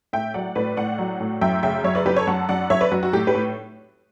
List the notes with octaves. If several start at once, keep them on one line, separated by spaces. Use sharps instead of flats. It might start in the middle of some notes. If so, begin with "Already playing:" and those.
A2 E5 G5
F#3 D5 F#5
A2 B4 D5
A2 D5 F#5
F#3
A2
F#2 E5 G5
C#3 E5 G5
F#2 C#5 E5
B4 D5
F#2 G4 B4
A4 C#5
F#2 F#5 A5
F#2 D5 F#5
F#2 C#5 E5
B4 D5
F#2 F#4
F#4
A2 G4
G4 B4
A2